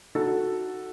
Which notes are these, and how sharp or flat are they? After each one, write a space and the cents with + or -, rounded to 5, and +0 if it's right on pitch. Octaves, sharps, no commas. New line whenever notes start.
D#4 +15 F#4 +0 A4 +0